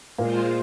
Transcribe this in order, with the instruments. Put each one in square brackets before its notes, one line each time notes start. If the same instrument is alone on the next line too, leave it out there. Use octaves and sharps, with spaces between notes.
[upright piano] A#2 A#3 [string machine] G#3 F4 C5